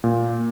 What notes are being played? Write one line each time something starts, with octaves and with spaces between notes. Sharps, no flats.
A#2